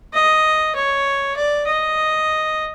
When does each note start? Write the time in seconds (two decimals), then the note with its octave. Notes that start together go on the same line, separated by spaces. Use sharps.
0.14 D#5
0.75 C#5
1.36 D5
1.67 D#5